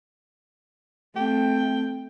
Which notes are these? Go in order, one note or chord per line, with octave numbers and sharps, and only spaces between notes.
A3 C4 G5